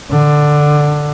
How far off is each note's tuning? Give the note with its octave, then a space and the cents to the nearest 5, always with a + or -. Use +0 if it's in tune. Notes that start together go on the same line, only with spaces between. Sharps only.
D3 +10